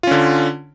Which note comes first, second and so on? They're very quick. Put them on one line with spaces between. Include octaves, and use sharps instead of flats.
F4 C#4 D3